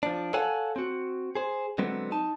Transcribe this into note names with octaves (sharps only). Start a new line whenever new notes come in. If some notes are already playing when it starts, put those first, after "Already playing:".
F3 D4
A4 C#5 F5 F#5 G#5 A5
C4 F#4
G#4 C5
D3 F#3 G#3 B3 C4
D#4 A5